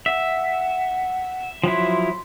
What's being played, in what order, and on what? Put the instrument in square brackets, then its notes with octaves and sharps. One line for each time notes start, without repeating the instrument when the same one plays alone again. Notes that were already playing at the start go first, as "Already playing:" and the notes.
[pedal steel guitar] E5 [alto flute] F#5
[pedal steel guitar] F3 F#3 E4 [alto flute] C6